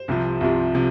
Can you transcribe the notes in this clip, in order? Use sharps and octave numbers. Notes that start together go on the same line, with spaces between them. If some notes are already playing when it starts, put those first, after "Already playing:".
Already playing: C5
C2 C3 F3
C2 C3 F3
C3 F3